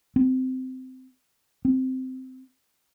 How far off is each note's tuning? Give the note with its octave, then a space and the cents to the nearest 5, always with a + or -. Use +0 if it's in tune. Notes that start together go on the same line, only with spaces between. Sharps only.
C4 -15
C4 -10